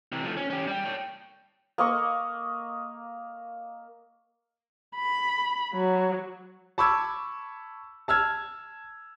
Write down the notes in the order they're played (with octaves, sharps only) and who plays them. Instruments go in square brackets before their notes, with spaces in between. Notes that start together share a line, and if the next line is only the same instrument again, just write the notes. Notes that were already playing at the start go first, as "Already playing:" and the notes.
[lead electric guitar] C3 E3
F3 A3
C#4
C#4 G4
G3 G4
C#5 G5
[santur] A#3 D#5 C#6
[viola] B5
F#3
[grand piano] A5 B5 C#6 D6 E6 G#6
A5 E6 F6 G#6